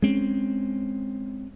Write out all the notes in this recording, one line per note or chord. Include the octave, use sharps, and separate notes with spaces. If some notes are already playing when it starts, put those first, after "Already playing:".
G#3 C4 C#4